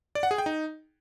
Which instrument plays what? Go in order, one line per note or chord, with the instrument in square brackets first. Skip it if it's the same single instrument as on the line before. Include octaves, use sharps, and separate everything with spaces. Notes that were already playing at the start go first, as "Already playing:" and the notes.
[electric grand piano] D5
F#5
G#4
G5
D#4